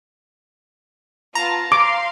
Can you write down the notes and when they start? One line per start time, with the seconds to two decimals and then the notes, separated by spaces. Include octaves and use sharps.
1.35 B3 F4 A5 A#5
1.72 C5 F5 C6 D6